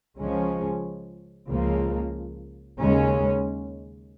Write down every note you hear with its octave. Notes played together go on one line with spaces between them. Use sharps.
C#2 C#3 F3 G#3 C#4
C#2 C#3 F3 A#3
D#2 C#3 G#3 C#4